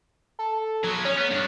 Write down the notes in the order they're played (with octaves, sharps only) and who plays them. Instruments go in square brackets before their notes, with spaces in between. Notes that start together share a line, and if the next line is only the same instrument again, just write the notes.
[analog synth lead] A4
[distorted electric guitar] F#3 B3 [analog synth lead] G#6
[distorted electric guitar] C#4 [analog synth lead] C#5
[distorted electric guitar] B3
G2 D4